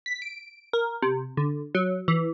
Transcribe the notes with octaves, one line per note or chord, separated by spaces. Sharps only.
B6
D7
A#4
C3
D3
F#3
E3